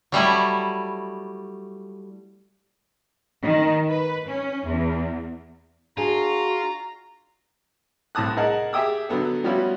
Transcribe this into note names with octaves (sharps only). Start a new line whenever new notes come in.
F#3 G3 A3 E4
D#3
B4
C#4
E2
D4 F4 F#4 G#4 A#5
C2 A2 A5 D#6 F#6
G#4 A#4 D#5 F#5 A5
G4 G#4 E5 G5 D#6 E6
D3 F#3 B3 A4
F3 G3 B3 C#4 E4 F#4